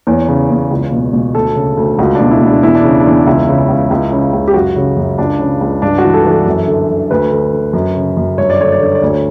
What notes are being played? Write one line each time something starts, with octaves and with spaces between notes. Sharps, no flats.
E2 C#5
C#3
E2
C#2
B2
B2
D2 A4
C#3
D2
C#2 F#4
D4
B2
E4
B2 D4
E2 E4
D4
C#3
D4
E2
C#2 E4
C#3
C#2
C#2
C#3
C#2
G4
F#2 F#4
C#3
F#2
C#2 D4
C#3
C#2
G2 D4
F#4
E3
A4
E3
A4
F#2
D3
D3
D2 B4
D3
D3
F#2
C#3
F#2
G2 C#5
D5
D3 C#5
D5
D3 C#5
D5
D2
C#5